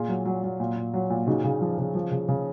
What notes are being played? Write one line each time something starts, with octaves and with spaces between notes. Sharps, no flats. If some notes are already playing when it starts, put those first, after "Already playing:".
Already playing: A#2 F4 G#4
F#3
F#3
F#3
A#2
A#2
F#3
A#2
C#3 D#4 F#4
C#3
F3
C#3
F3
C#3
C#3